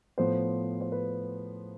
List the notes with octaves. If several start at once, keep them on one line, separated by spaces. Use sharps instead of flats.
A2 F3 B3 C5
C5
B4